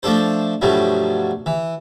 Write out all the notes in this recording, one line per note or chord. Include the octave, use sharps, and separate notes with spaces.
F3 A3 D4 A4 C5
G2 B2 F3 F#3 A3
E3